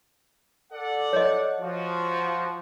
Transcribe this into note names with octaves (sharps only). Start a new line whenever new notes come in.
A4 D5 F#5
C#5 D#5
F3 F#4